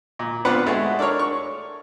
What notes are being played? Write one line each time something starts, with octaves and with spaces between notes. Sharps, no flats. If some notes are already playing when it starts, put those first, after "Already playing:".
A#2
B3 C4 D4 F4 B4 F#5
G#3 A3 F#4
D4 A4 A#4 C#5
C#6